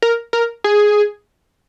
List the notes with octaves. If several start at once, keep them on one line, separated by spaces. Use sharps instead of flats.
A#4
A#4
G#4